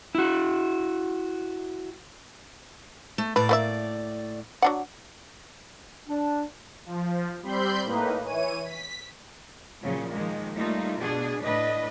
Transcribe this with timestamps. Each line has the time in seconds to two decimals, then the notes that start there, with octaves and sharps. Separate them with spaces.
0.15 E4 F#4
3.18 A3
3.36 A2 B4 D5
3.49 A#3 B4 E5
4.62 F#3 D4 F#5
6.08 D4
6.86 F3
7.42 G3 C4 B5 C6 G6
7.83 A2 A#3 D#4 B4
8.23 E3 C#5 D#7
8.63 B6
9.83 A#2 C#3 F3 F#3
10.13 D#3 F3 G#3 A#3
10.57 G3 A3 A#3 D#4 F4
10.98 B2 D4 G#4
11.42 A2 D4 B4 D#5